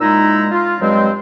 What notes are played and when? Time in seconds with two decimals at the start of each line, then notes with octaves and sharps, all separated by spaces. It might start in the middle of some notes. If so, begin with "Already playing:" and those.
0.01 A#2 G#3 D#4 E4 A#5 E6
0.51 F4
0.80 G2 F#3 G#3 C4